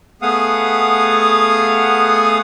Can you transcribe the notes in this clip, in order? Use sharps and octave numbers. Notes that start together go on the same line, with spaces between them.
A3 B3 G#4 F5 F#5 D#6